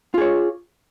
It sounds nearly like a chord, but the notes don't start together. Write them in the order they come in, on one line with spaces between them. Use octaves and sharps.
F4 G#4 C#5